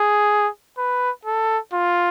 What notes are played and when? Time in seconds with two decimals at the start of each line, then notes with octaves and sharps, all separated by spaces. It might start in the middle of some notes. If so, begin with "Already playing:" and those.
Already playing: G#4
0.77 B4
1.25 A4
1.73 F4